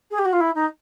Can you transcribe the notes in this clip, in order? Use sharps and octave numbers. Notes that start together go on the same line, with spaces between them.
G#4
G4
F#4
F4
E4
D#4